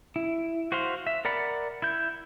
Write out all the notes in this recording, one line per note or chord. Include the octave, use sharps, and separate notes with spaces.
E4
F#4 C5 E5 F5 C6
E5
A#4 D5 F#5 B5
E4 G6